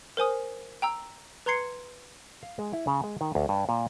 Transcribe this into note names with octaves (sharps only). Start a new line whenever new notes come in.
A#4 C5 G#5 D#6
G5 A#5 E6
B4 A#5 C6 G#6 C7 C#7
F5
G#3
E4
C#3
G#3
D#3
D2
G2
A#2